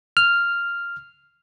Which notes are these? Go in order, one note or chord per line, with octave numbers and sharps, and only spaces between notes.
F6